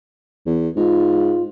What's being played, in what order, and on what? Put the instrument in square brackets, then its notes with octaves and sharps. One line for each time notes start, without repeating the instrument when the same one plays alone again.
[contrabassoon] E2
[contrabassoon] G#2 [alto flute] F4